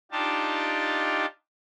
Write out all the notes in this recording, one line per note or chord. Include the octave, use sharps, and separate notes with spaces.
D4 D#4 F4 G4 A5